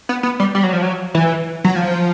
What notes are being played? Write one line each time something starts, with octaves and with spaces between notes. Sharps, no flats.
B3
B3
G3
G3
F#3
F3
F#3
E3
F#3
F3